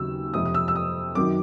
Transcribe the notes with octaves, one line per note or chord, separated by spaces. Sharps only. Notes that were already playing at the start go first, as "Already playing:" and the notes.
Already playing: D#2 C#3 F#3 E6
F2 C3 F3 D#6
D#6
E6
E6
D#6
F#2 D#3 F#3 D6